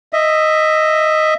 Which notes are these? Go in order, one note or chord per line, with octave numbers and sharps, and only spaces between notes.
D#5 E5